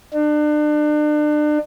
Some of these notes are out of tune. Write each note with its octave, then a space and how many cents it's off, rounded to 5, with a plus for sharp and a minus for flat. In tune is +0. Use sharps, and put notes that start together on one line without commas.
D4 +35